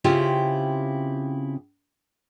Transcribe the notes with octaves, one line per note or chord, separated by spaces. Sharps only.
C#3 C4 E4 F4 G4 G5